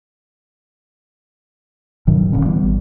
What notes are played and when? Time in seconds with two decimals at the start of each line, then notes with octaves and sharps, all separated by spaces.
2.07 G2 B2 D#3 F#3
2.32 D1 A#2 D3 C#4
2.45 E3 G3 B3
2.63 G#1